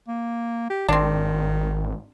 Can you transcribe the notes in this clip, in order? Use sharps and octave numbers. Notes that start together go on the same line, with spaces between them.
A#3
G4
G#1 D#3 C4 D4